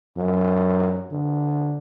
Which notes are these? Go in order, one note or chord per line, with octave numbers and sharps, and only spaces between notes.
F#2
D3